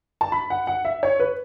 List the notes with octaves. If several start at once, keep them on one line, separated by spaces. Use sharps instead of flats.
A5
B5
F#5
F#5
E5
C#5
B4